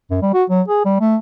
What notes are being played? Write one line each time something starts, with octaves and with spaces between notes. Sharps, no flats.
F#2
G3
F#4
F#3
G#4
G3
A3